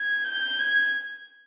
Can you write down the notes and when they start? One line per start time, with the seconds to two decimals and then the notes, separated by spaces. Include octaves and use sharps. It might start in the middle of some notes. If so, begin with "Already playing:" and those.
Already playing: G#6
0.24 G6
0.59 G#6